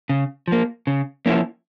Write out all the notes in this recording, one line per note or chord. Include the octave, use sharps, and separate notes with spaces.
C#3
F3 A#3
C#3
F3 A#3 C#4 E4